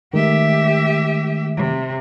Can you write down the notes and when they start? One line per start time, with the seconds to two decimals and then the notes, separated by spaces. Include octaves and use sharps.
0.14 D#3 G#3 A3 G4 E5
1.57 C3